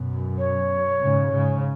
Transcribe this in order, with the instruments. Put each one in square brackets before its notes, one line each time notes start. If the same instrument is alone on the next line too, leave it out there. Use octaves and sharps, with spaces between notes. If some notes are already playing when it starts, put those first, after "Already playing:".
Already playing: [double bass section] F#2 B2
[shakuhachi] C#5
[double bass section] G#2 C#3
G#2 C#3